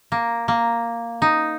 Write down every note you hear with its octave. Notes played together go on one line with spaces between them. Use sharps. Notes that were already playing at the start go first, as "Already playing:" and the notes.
A#3
A#3
D#4